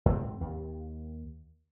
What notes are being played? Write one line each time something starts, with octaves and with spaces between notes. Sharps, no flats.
G#2 C4
D#2